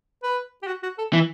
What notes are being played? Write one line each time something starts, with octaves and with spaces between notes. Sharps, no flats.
B4
G4
F#4
F#4
A4
E3